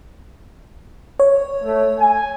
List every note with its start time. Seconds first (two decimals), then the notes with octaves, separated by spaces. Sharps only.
1.20 C#5
1.63 A3
1.99 G#5